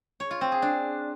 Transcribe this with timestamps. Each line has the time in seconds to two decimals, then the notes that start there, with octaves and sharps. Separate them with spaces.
0.20 C#5
0.31 F4
0.41 C4
0.52 G#4
0.62 D4